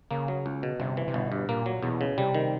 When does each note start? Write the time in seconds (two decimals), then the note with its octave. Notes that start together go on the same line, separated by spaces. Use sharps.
0.11 C#3 A#3
0.28 F#3
0.46 C#2
0.63 B2
0.80 G1 C3
0.97 E3
1.08 C3
1.14 G1 B2
1.32 G2
1.49 A#2 A#3
1.66 F#3
1.83 E2 B2
2.01 C#3
2.18 C3 G3
2.34 D#3